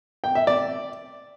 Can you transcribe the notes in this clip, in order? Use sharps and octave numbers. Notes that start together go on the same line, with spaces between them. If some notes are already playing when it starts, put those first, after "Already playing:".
G5
E5
D5